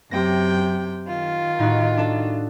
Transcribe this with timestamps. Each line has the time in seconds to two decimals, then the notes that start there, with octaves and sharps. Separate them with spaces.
0.11 F#2 C3 G5 A#6
0.50 G6
1.07 D#3 F4
1.59 A2 D#4 F#4
1.97 D4 A4